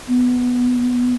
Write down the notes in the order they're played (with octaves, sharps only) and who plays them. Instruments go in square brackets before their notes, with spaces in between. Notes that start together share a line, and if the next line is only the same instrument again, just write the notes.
[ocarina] B3